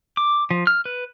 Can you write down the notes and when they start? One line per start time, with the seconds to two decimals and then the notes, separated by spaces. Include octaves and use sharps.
0.17 D6
0.51 F3
0.67 F6
0.85 B4